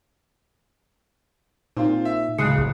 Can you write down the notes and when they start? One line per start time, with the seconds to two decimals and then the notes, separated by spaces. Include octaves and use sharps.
1.77 A#2 C4 D#4 F4
2.05 E5
2.38 D1 C#3 G#3 D#6 F#6 C7 C#7
2.58 C2